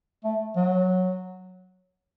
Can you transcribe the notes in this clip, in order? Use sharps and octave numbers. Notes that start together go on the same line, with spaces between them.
A3
F#3